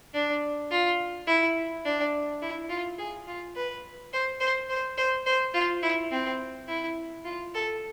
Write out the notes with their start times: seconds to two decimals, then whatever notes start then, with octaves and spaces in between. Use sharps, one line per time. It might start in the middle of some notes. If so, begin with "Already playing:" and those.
0.14 D4
0.71 F4
1.27 E4
1.85 D4
2.42 E4
2.70 F4
2.98 G#4
3.28 F4
3.56 B4
4.13 C5
4.40 C5
4.70 C5
4.98 C5
5.26 C5
5.54 F4
5.83 E4
6.11 C4
6.69 E4
7.25 F4
7.54 A4